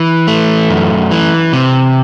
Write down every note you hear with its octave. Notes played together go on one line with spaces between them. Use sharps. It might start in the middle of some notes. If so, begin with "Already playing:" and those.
Already playing: E3
A3
F#2
E3
C3